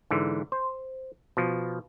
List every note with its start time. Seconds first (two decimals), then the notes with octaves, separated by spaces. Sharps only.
0.11 G#2 D3 E3
0.52 C5
1.37 B2 F3